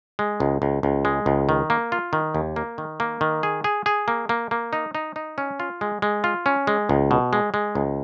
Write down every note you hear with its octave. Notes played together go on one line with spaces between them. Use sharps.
G#3
C#2
C#2
C#2
G#3
C#2
D#3
A#3
F4
D#3
D#2
A#3
D#3
A#3
D#3
G#4
G#4
G#4
A#3
A#3
A#3
D#4
D#4
D#4
C#4
F4
G#3
G#3
F4
C#4
G#3
C#2
B2
G#3
G#3
C#2